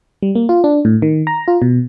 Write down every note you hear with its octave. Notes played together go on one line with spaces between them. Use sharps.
G3
A#3
F4
D4
A2
D#3
A#5
F4
B2